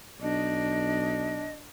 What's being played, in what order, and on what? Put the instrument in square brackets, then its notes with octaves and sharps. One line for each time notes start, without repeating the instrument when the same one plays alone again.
[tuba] B1 [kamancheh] D4 [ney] D#5